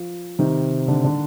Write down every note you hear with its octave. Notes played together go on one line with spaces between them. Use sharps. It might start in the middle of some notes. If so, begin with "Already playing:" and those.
Already playing: F3
C3 D#3 D#4
D3 D4
D3 D4